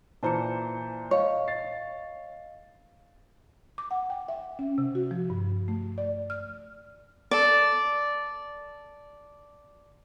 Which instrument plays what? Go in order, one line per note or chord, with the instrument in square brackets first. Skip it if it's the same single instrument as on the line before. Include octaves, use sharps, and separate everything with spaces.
[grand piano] A#2 E3 C5 [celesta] A5 A#5 C#7
[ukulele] C#5 [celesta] D#5 F5
[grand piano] A6 C7
[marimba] D6
F#5
G5
E5
C#4
C3
F#4
F3
G2
A3
D5
F6
[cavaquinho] A4 D5